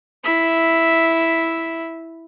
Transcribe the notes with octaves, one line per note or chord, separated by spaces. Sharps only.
E4 E5